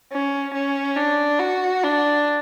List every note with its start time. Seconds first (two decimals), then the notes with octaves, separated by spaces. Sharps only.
0.12 C#4
0.54 C#4
0.97 D4
1.39 F#4
1.84 D4